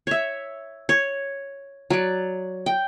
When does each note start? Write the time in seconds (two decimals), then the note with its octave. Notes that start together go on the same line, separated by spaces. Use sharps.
0.07 C#5 E5
0.89 C#5
1.90 F#3 D5
2.66 G5